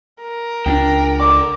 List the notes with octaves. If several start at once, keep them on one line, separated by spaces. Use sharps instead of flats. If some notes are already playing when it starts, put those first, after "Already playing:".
A#4
C#2 C4 D4 G5
D5 F#5 D6